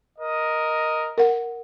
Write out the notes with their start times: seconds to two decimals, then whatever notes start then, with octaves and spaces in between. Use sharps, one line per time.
0.19 A#4 D#5
1.18 A#4 F#5